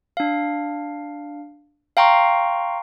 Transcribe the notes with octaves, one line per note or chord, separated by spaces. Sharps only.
D4 F5
F5 G5 A#5 C6 C#6